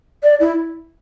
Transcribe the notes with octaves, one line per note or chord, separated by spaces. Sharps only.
D5
E4